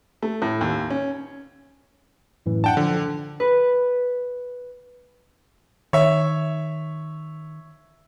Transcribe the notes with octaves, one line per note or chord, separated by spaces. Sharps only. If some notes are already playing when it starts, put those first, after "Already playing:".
A3
A2
D#2
C#4
F#2 A2 E3
D4 F#5 G5 A5
D3 F3
B4
D#3 C#5 E5